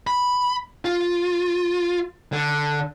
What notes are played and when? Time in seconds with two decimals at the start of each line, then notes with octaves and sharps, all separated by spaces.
0.07 B5
0.85 F4
2.32 D3